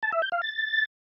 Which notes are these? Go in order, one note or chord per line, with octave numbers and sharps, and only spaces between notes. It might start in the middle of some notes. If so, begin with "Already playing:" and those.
A5
E5
G6
F5
A6